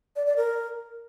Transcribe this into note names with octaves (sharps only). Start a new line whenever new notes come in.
D5
D5
A#4